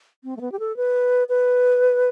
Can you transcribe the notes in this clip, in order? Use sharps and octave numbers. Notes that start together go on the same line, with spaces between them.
C4
A3
B3
G4
A4
B4
B4